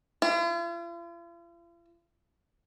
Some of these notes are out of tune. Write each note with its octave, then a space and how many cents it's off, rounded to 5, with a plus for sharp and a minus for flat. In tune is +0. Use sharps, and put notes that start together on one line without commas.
F4 -45